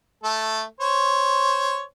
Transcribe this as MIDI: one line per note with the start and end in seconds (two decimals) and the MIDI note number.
0.24 0.63 57
0.24 0.63 69
0.81 1.82 72
0.81 1.82 73